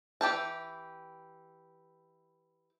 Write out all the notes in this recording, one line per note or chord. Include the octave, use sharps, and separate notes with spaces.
E3 G4 G5 A5